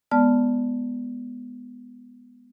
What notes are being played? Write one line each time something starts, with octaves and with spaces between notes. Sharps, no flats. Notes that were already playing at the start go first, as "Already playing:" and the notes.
G#3 B3 D5 A5 F6